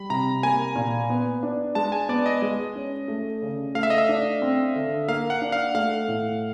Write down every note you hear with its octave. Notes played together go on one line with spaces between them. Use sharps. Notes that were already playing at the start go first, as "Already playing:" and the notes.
Already playing: G3 B5
C3 A#5
A#3 G#5
A#2
B3
D4
G#3 A5
G#5
B3 D5
D#5
G#3 D#5
C#4
A3
C#3
A3 F5
E5
D#5
E5
D4
C4
D3
A#3 F5
F#5
D4
F5
A3 F5
A2